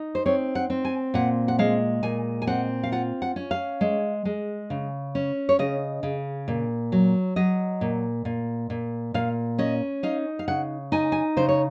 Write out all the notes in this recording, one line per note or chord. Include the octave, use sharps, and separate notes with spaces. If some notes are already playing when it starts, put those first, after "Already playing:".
Already playing: D#4
C5
C4 C#5
F#5
C4
G#5
A#2 F#5
F#5
G#3 F5
A#2 G#5
G#5
C4 F#5
F5
F4 F#5
F#5
C#4
F5
G#3
G#3
C#3
C#4
C#5
C#3 D#5
C#3
A#2
F#3
F#3 D#5
A#2
A#2
A#2
A#2 F5
C#4 D#5
D#4 F5
F5
C#3 F#5
D#4 G#5
G#5
C#3 C5
C#5